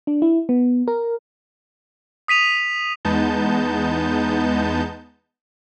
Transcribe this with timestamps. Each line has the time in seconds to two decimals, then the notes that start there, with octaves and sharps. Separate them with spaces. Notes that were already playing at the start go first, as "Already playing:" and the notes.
0.07 D4
0.22 E4
0.49 B3
0.88 A#4
2.28 D#6 B6 D#7 F7
3.05 E2 G#3 B3 D#4 A5 G6